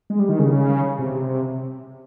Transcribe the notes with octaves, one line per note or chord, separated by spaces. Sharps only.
G#3
G3
D#3
C#3
C3